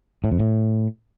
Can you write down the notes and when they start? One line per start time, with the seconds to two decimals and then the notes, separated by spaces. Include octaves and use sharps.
0.24 A2
0.32 F2
0.39 A2